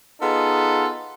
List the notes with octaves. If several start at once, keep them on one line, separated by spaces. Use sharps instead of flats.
B3 D#4 F4 G#4 A4